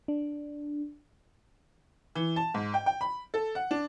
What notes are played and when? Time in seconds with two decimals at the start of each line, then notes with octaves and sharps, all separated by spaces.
0.08 D4
2.15 E3
2.36 A5
2.54 G#2
2.74 G5
2.86 G5
3.01 B5
3.34 A4
3.55 F#5
3.71 D4